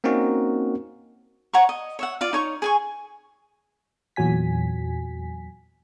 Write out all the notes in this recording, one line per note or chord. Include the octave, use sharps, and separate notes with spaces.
A#3 C4 C#4 D#4 F#4 A#4
C#5 F#5 A#5 C#6
D#5
C#5 E5 F#5
F4 D5 F5
D#4 C#5 C#6
G#4 G#5 C#6
E2 A#2 F#3 G#5 B6